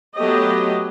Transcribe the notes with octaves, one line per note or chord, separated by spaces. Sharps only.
F#3 A3 B3 G4 D#5